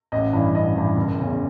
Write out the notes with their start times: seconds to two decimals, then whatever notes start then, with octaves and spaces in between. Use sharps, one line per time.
0.12 A1 D#5
0.33 G2 E3
0.55 A1 D#5
0.76 G2 E3
0.96 F#1
1.18 E2 C#3